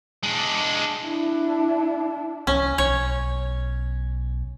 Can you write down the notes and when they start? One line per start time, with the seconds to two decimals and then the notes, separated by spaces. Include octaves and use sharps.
0.23 G#3 D4
1.03 D4 E4
2.47 C2 C#4
2.78 B1 C#5